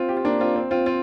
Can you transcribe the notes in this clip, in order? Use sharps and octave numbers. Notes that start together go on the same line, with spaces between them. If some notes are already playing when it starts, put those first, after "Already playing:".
Already playing: C4 F4
G4
F4
A#3 D4
C4 F4
C4
C4 F4
C4 F4